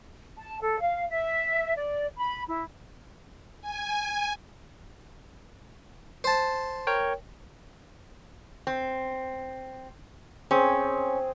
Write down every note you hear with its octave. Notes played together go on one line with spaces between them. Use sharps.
A5
A4
F5
E5
D5
B5
E4
G#5
C5 A5
A#4 C#5 G5
C4
C4 C#4 G#4